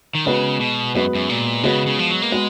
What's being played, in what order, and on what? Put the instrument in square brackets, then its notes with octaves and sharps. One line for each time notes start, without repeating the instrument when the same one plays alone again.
[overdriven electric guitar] D#3
[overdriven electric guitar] C#3 [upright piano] G#3 B3 F#4 B4
[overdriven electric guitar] B2
[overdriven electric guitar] F#2 [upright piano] G#3 B3 F#4 B4
[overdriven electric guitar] F#2
A#2
[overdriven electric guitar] C#3 [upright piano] G#3 B3 F#4 B4
[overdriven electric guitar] C#3
F3
F#3
A#3
[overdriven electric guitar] G#3 [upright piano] B3 F#4 B4